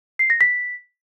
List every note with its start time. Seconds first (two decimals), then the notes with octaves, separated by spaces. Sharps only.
0.19 C7
0.30 A#6
0.41 B6